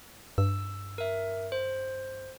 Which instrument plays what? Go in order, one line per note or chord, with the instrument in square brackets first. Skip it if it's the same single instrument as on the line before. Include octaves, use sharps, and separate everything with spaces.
[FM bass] G2 [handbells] E6
[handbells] A#4 E5
C5